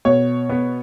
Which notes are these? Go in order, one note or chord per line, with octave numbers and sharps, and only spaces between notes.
B2 C#5
B3